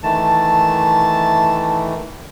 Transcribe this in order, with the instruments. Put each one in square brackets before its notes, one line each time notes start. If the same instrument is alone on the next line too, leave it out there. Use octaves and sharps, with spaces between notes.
[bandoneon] D#3 E3 A3 [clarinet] A5